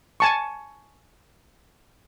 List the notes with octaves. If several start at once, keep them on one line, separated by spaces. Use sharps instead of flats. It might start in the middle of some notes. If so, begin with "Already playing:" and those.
G#5 A5 C#6